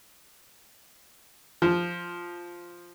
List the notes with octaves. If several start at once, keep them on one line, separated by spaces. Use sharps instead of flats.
F3